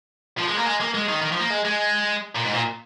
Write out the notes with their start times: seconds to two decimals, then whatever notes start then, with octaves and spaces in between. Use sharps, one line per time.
0.38 F3
0.47 G#3
0.57 A#3
0.66 G#3
0.80 A#3
0.94 G#3
1.09 D#3
1.22 D#3
1.32 F3
1.41 A#3
1.50 G#3
1.65 G#3
2.35 A#2
2.44 G#2
2.54 A#2